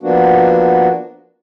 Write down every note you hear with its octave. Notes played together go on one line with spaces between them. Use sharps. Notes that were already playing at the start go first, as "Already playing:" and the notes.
F3 A#3 B3 D4 F#4